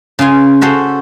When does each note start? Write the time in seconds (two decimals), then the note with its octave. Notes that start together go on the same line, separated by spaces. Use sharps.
0.19 C#3 C#4 F4 G#5
0.61 C#4 F#4 A4 C5